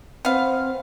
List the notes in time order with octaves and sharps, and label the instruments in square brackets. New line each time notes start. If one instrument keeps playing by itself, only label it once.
[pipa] B3 F5 [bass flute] C4